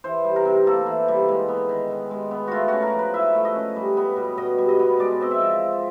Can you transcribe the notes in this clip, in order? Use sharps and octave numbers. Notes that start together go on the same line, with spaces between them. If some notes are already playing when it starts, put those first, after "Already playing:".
E3 C5
G3
A#4
C3
A#3 A4
E3
G3
G#3
B3
D#3
D#3
G#3
B3
A3 F4 F#4
C#4 F#4
A#4
F3
B4
E4 E5
A3
D#5
C#4
G3
B3
B2
B2 D#5
G3
D#5
B3
G#3 D5
C4 D#5
E5
F3